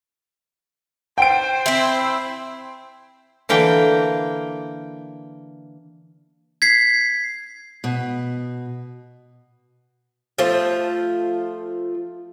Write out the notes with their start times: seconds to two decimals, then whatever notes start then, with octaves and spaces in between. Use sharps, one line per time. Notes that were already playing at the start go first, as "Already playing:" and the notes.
1.18 C5 G5 D7
1.66 C4 E4
3.49 D3 E3 A#3 G5
6.62 G#6 B6 C7
7.84 B2
10.38 F3 A3 F4 C5